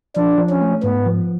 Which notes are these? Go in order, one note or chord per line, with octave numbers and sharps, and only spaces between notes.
F3 D4
F3
C#4
A3
G#2 B3
F3